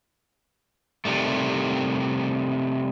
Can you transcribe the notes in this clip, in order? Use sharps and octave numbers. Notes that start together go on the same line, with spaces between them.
C3 D#3 G3 A3